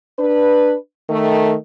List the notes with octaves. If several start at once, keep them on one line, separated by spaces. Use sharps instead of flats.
D4 B4
D#3 A3